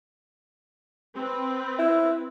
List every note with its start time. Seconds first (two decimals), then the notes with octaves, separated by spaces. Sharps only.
1.15 C4 B4
1.78 E4